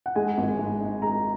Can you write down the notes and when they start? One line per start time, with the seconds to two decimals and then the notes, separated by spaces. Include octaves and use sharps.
0.06 F#5
0.16 G#3 G#5
0.38 G#1
0.59 G#2
0.81 D#4
1.02 G#3 A#5